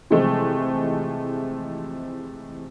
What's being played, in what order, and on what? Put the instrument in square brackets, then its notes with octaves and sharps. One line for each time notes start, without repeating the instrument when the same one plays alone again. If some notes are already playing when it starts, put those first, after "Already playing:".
[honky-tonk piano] C3 E3 F3 G#3 A3